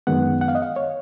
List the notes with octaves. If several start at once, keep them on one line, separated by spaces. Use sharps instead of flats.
F#2 D#3 G#3 B3 F#5
F#5
F5
D#5
F5
C#5